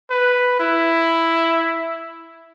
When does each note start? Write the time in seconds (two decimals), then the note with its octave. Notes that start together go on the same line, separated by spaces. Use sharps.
0.10 B4
0.60 E4